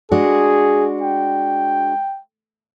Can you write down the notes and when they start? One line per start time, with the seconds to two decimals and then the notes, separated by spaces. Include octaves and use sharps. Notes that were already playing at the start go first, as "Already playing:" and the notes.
0.11 G#3 D4 F#4 G#4
1.02 G5